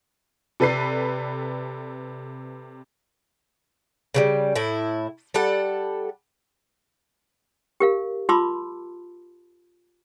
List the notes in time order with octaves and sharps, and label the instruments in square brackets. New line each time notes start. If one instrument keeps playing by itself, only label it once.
[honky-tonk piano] C3 A4 B4 D5 C7
[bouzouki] C#3 F3 G3
A2 E4
G3 A4 F#5
[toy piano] G4 A#4 F5
F4 A5 B5 C6 D6 E6